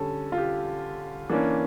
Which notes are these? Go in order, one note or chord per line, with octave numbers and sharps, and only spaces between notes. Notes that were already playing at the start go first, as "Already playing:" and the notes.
Already playing: D3 G3 C#4 A4
F4
G4
E3 A#3 C#4 D4